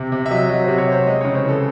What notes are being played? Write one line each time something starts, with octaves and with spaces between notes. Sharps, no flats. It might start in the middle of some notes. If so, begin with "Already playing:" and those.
Already playing: C3
C3
E5
F#3 D#5
F#3 D#5
C5
C3
C#5
C3 C5
G#3 D#5
C#3 C#5
C5
E3
A4